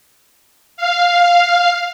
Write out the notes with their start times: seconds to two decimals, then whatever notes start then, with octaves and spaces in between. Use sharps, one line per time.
0.77 F5